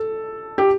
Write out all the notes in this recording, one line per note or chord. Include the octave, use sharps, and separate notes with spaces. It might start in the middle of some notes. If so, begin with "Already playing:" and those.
Already playing: A4
G4